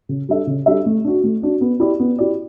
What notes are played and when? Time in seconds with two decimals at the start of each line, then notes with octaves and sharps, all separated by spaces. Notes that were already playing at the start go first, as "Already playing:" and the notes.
0.09 C#3
0.29 G3 D4 A4 E5
0.47 C#3
0.66 G3 D4 A4 E5
0.86 A3
1.04 D4 F#4
1.24 A3
1.42 D4 F#4
1.61 B3
1.80 E4 G4 D5
2.00 B3
2.19 E4 G4 D5